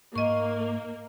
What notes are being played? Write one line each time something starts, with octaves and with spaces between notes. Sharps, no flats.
G#2 A#3 D#5 C#6